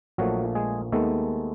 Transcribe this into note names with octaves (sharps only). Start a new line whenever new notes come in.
A#1 A#2 F3 F#3 A3 F#4
G#3 G#4
D#2 D#3 G#3 A3 B3 A4